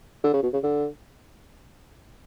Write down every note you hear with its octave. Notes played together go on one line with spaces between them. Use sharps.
D3
C#3
B2
C#3
D3